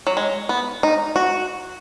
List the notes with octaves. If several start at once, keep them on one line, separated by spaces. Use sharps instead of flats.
F#3
G#3
B3
D#4
F#4